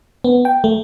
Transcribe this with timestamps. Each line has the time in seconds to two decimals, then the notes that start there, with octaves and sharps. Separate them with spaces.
0.24 B3
0.45 G5
0.64 A3